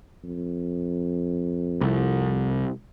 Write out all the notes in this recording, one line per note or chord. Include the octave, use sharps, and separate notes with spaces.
F2
C2